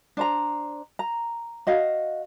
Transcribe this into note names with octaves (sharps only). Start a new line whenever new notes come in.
D4 C5 A#5
A#5
F#4 D#5 F5